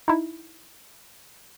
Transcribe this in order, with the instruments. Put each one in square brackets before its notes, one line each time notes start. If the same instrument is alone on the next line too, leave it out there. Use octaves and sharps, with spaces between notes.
[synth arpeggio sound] D#4 E4